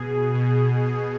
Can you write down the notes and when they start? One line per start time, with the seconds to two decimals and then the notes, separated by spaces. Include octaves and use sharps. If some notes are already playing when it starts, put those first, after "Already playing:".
Already playing: B2 G#4
0.34 B2
0.85 G#4